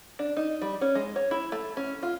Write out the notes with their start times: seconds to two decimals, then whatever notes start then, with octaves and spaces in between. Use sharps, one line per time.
0.19 D4
0.37 D#4
0.61 G3
0.81 C#4
0.95 G#3
1.16 C#5
1.31 E4
1.52 A3
1.77 C#4
2.03 F4